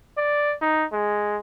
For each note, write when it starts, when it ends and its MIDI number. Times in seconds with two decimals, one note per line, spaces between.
0.18 0.56 74
0.62 0.85 63
0.93 1.38 56